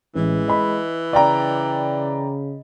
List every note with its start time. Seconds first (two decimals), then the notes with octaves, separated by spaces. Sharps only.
0.15 A1 E3 G#3
0.48 D#5 B5
1.13 C#3 D5 G5 A#5